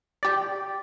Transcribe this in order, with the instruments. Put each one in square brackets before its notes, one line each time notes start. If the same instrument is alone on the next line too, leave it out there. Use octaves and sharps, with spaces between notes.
[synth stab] G4 D5